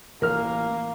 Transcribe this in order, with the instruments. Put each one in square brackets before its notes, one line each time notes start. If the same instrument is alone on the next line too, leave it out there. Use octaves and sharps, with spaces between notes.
[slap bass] A1 [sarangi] A#3 [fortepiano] A#4 F6